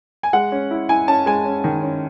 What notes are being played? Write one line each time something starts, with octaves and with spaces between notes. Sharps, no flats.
G#5
G#3 F#5
C#4
E4
E4 G#5
C#4 A5
G#3 G#5
C#4
D#3
C#4